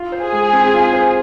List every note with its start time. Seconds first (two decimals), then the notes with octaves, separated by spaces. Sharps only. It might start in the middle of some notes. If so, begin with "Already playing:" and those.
Already playing: F4
0.12 C5
0.22 G#4
0.32 G#3
0.53 C4
0.74 F4
0.93 C5